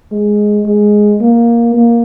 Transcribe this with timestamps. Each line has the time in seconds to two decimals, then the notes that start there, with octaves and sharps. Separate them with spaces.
0.12 G#3
0.66 G#3
1.21 A#3
1.74 A#3